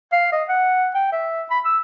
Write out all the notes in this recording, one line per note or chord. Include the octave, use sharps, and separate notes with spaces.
F5
D#5
F#5
G5
E5
B5
E6